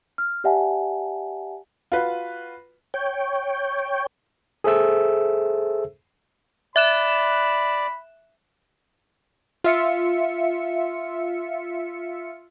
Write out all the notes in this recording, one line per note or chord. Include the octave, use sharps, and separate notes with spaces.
F6
G4 D5 E5 F#5 G#5 A5
F4 F#4 B4
C#5 G5
G#4 A4 C5 E5 E6
D5 E5 B5 F#6 E7
F4 E5 C#7